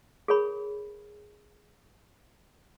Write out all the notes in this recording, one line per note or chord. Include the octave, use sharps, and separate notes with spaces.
G#4 A#4 C#5 B5